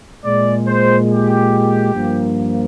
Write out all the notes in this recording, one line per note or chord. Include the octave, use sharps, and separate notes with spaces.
A#2 G#3 D5
C5
G4
G2 F3 A#3